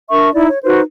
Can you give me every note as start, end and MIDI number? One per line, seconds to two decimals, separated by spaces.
0.10 0.29 62
0.10 0.29 70
0.10 0.29 76
0.10 0.29 85
0.33 0.47 63
0.33 0.47 64
0.33 0.47 74
0.48 0.59 73
0.63 0.81 63
0.63 0.81 66
0.63 0.81 71
0.63 0.81 72